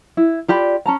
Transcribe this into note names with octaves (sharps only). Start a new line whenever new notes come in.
E4
F4 G4 D5 B5
C#4 A5 A#5